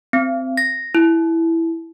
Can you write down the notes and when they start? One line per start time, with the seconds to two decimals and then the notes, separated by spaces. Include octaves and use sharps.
0.13 C4
0.57 A#6
0.95 E4